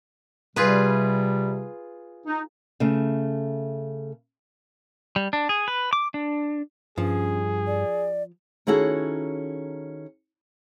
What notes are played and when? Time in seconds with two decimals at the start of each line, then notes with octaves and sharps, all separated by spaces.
0.56 C3 G3 F4 G#4 B4
2.27 D#4
2.80 C#3 A3
5.16 G3
5.33 D4
5.49 G#4
5.68 B4
5.93 D6
6.14 D4
6.98 G2 F3 C#4 G#4
7.67 D5
8.67 D#3 C#4 E4 F#4 G#4 A4